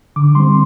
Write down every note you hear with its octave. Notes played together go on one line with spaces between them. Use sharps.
D3 D6
G3 C4 C6